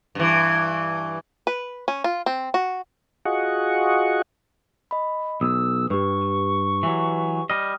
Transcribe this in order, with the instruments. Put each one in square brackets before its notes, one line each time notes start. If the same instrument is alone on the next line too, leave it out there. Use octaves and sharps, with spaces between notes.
[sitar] G2 E3
[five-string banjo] B4
C#4
F4
C4
F#4
[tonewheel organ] F4 F#4 G#4 D#5 F#5 C#6
[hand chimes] D#5 B5
[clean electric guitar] B1 [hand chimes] D#6 [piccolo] E6
[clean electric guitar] G2 [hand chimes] G4 B4 [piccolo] C#6
[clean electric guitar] E3 F#3
[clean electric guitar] G3 D#5 [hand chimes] D#6 F6